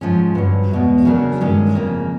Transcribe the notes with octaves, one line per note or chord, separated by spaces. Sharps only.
G#2 F3 G#3 C#4
G2 D3 F#3
E2 B2 G#3
C#3 F#3 A#3 D4
G2 D#3 G#3 C#4
F2 C#3 F3 A#3